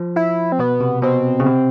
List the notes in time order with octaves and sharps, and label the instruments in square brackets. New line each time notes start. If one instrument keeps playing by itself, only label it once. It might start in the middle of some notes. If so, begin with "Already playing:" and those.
Already playing: [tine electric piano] F3
[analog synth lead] E4
C4
[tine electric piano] B2 [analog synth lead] B3
[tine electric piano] C3
[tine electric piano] B2 [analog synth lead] C4
[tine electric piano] C#3
C3